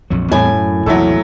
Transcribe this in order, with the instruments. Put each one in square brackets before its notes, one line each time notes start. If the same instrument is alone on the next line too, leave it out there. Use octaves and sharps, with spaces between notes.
[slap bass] A#1 F2 F#3
[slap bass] E2 G3 C4 [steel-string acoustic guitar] A2 G#5
[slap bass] F#2
[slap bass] A#1 E2 C3 [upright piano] F#3 E4 A4